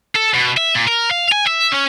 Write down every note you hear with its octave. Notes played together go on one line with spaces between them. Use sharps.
A4
B2
E5
A#2
A#4
F5
G#5
E5
C#4